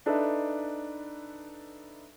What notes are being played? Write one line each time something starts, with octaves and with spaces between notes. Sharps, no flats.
D4 D#4 A4 B4 E5